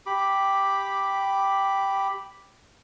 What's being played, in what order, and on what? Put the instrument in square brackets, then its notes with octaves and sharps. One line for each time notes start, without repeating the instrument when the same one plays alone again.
[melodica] G4 B5 D6